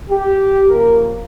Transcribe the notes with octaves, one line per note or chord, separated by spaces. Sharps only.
G4
C#3 F3 A#3 A#4